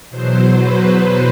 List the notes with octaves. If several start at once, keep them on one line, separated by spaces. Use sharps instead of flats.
E2 B2 F#3 C5
B4